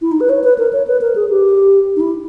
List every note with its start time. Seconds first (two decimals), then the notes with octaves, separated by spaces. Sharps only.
0.02 E4
0.12 D#4
0.21 B4
0.29 C#5
0.44 B4
0.58 A#4
0.73 C#5
0.87 B4
1.01 A#4
1.16 G#4
1.30 G4
1.96 D#4
2.01 E4